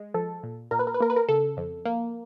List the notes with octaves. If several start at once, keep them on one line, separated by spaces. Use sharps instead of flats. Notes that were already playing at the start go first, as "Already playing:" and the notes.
Already playing: G#3
F3 A4
A#2
A#2 A#4
B4
A#4
B4
A#3 A#4
B4
A#4
C#3 A4
F2
A#3